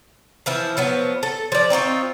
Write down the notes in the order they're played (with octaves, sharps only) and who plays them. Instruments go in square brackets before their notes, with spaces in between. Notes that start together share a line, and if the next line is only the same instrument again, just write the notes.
[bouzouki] E3 F3 E4
F3 F#3 B3
A4
F3 D5
C4 D#4 F4 C#5